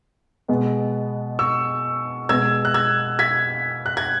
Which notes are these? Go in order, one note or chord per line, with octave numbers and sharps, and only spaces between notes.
B2 G#3 B3
C#6 E6
B2 G#3 B3 E6 G#6
F#6
E6 G#6
G#6 B6
F#6
G#6